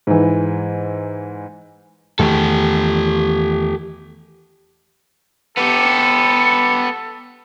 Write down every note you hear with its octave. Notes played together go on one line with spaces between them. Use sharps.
G#2 E3
E2 D#3 A3 G4 A4
B3 G4 A4